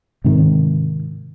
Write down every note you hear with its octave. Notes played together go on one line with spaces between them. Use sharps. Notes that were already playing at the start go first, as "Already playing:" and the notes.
G#2 C3 D#3